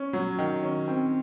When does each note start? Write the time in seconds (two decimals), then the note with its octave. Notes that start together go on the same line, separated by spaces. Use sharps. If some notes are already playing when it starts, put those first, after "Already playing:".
Already playing: C#4
0.13 F#3
0.38 D#3
0.63 C#4
0.88 C4